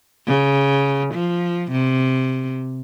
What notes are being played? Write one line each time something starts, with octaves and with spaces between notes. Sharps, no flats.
C#3
F3
C3